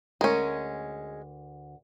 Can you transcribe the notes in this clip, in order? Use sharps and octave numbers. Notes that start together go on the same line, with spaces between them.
D2 G#3 C#4 A#4